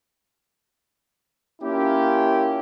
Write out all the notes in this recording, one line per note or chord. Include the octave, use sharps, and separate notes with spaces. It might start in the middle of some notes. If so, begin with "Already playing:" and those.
A#3 C#4 E4 F4 G4